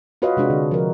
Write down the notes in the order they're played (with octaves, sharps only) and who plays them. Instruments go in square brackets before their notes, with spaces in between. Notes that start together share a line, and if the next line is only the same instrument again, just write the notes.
[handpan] F4 F#4 B4 C#5 D#5 F5
C3 G#3 D4 F#4
D3
F3 A#4